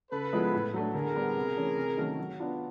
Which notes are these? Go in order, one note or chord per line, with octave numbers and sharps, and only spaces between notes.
C#3 A4 B4
F3 G#3 B3 E4
A2
F#3 A3 D4
D3 G#4 A#4
G3 B3
C3
E3 A3 C#4
C3
D#3 F#3 A3 C#4
F#3
B3 D4 F4